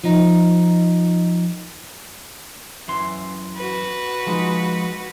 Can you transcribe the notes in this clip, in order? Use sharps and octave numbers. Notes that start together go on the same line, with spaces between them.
F3 D#4
F#2 E3 C6
F#4 B4
F3 G#3 D#4